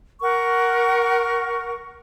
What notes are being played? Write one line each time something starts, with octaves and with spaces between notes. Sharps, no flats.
A#4 F#5 C#6